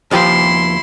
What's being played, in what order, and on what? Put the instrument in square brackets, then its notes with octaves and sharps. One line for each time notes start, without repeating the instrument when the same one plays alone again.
[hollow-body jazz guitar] D#2 F3 G4 [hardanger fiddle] E4 C6